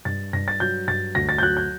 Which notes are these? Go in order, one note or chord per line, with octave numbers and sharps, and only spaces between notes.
G2 A6
G2 A#6
A6
F#3 G6
G2 A6
D2 A#6
A6
G6
F#3 F#6
G6